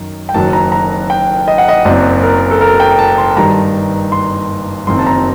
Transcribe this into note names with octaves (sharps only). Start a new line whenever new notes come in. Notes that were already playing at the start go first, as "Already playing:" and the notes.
Already playing: F#2 D#3
G5
F#1 F#2 D#3 F#3 A5
A#5
A#5
G5
D#5
F#5
D#5
F#1 F#2 F#3 C4 D5
A#4
A4
A#4
G5
A5
C6
G2 D#3 G3 A#5
C6
F#1 F#2 D#3 F#3 C4 C6
A5
A#5